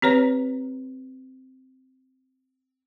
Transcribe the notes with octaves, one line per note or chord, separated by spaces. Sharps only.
C4 G4 B4 C#5 A#5